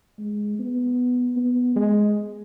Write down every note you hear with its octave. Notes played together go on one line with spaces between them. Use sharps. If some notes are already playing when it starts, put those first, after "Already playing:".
G#3
B3
B3
G#3